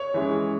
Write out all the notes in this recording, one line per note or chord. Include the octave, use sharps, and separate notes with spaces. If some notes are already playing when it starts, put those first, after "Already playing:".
Already playing: C#5 C#6
E3 G#3 C#4